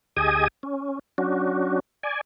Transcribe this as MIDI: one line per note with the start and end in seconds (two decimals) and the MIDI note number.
0.17 0.48 38
0.17 0.48 67
0.17 0.48 68
0.17 0.48 75
0.17 0.48 80
0.17 0.48 87
0.63 0.99 61
1.18 1.80 54
1.18 1.80 61
1.18 1.80 62
1.18 1.80 66
2.03 2.21 74
2.03 2.21 80